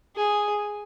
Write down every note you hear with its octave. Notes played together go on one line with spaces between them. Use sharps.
G#4